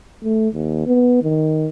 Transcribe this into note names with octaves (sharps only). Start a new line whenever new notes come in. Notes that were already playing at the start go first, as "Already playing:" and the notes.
A3
D#2
B3
D#3